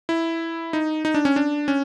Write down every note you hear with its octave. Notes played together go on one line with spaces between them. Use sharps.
E4
D#4
D#4
D4
C#4
D4
C#4